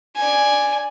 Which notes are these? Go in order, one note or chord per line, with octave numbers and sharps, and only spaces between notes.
D5 G#5